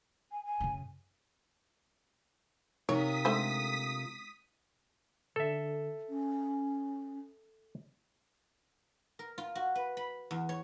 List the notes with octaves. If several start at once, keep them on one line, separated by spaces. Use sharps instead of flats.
G#5
G#5
F#2 C#3
C3 D#4 F4 A#4 C#5 D#6 B6
D3 G#3 A3 C5
D3 A4 E5
C#4
A#4
F4
F#4
B4
B5
E2
C#5